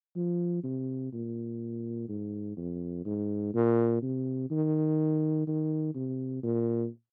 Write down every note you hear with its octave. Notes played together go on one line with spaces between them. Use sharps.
F3
C3
A#2
G#2
F2
G#2
A#2
C3
D#3
D#3
C3
A#2